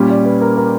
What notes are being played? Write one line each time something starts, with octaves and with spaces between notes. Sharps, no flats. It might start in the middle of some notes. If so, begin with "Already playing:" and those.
Already playing: A#2 G3 C#4
D5
B4
A#4
A#4